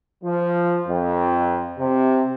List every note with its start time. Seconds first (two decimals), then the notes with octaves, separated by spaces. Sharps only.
0.23 F3
0.88 F2
1.79 C3